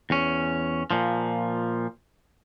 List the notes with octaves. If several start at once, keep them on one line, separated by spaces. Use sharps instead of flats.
E2 C#4
A#2 F3